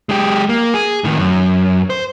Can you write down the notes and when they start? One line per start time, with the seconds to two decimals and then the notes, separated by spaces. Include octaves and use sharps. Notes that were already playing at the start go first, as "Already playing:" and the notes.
0.09 G#3 G4
0.49 A#3
0.74 G#4
1.04 A2 D#3
1.18 F#2
1.90 C5